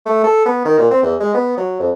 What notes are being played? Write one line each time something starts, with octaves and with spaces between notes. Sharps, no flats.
A3
A4
B3
D#3
A#2
C4
E2
G#3
B3
F#3
F2